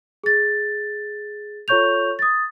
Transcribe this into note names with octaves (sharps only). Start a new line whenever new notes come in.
G#4 A6
F4 A4 C#5 C#6 G6 F7
D#6 A6